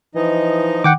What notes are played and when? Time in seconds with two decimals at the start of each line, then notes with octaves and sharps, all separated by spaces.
0.15 E3 F3 D#4 D#5
0.84 D#3 F#5 G5 D6